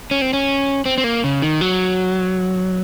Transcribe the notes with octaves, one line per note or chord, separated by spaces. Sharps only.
C#4
C4
C#4
C4
C4
A#3
C#3
D#3
F#3